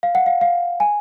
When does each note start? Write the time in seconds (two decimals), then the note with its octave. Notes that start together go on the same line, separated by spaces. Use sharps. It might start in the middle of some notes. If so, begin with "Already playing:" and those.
0.03 F5
0.15 F#5
0.26 F5
0.41 F5
0.80 G#5